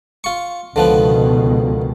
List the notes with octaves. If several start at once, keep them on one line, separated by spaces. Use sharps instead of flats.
F4 C#6
C#2 B2 D3 D#3 F3 B3